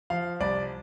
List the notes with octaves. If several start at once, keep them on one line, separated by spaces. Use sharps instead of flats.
F3 F5
C2 D5